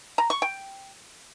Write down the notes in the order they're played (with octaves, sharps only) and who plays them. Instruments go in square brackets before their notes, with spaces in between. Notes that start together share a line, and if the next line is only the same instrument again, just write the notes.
[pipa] A#5
C#6
G5